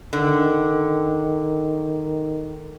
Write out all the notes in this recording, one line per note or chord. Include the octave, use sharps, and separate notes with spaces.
D3 D#3